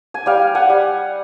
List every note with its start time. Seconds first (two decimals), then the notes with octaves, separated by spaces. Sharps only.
0.14 G#5
0.26 G3 F5 G5
0.55 F#5 G#5
0.69 G3